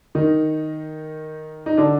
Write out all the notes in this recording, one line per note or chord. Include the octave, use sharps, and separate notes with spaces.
D#3 D#4
D#4
D3 D4